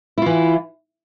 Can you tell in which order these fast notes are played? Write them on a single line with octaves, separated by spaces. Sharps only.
E4 F4 E3